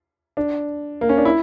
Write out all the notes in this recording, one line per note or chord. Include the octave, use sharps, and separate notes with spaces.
D4
A#3
C#4
D4
E4